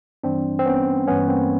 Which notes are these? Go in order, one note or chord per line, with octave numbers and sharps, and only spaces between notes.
G2 E3 G3 C4 D4
C4
B3 C#4
G2 E3 G3 B3 C#4
A#3 C4